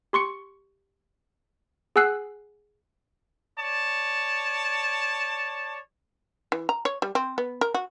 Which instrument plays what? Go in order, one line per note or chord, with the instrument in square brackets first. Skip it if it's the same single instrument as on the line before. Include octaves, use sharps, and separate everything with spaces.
[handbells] G4 C6 C#6 C#7
G#4 F#5 G#5 E6 F#6 C7
[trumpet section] C#5 D5 A5
[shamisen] E3
A#5
C#5
G3
C4
B3
A#4
F#4